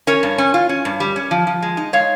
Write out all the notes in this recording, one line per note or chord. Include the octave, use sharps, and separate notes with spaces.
C#4 A#4 C#5
G2
C#4
F4
C#4
G2
G3
C#4
F3
F3
G#3
D#4
G#3 C#5 F5